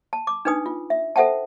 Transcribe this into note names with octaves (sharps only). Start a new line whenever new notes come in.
A5
D6
D4 D#4 B4 G#5 D#6
F4
E5
A4 C5 E5 F#5 G5 A5